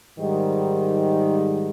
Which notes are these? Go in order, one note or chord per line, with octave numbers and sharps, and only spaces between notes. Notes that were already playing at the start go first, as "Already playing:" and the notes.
G#2 D#3 G3